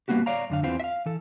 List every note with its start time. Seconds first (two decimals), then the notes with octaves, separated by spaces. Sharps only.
0.08 G3 A#3 B3 F#4 G4
0.26 C#5 D5 F5 A#5
0.50 F#2 D3 F5
0.63 E2 E3 C4 F4
0.80 E5 F5
1.06 E3 A4